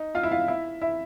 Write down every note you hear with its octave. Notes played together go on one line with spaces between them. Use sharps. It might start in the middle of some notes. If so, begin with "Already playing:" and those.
Already playing: D#4
F4 F5
E4 E5
F4 F5
E4 E5
E4 E5